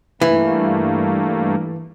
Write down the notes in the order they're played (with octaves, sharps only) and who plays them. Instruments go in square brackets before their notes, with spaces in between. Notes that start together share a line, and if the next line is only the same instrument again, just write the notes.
[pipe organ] G2 A3 A#3 [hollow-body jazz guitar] E3